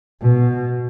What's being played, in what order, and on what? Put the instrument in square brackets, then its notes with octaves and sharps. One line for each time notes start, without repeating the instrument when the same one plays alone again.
[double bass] B2